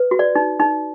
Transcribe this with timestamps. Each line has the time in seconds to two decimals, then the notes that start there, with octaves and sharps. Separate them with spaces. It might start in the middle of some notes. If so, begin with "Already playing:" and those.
Already playing: B4
0.11 F#4
0.19 D5
0.35 D#4
0.60 D#4